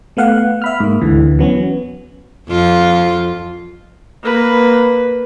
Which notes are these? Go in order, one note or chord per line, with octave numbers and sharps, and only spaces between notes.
A3 B3 F5 F#5
E5 B5 F6
G#2 A#3
D2 D3 E3
F#3 B3 C#4
F2 F4
A#3 B4